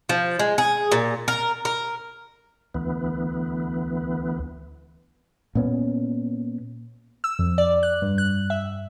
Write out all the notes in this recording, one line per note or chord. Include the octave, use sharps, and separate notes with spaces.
F3
G#3
G#4
A#2
A#4
A#4
D2 E3 B3
A#2 B3 C#4
E6
F2
D5
F#6
G2
F#6
E5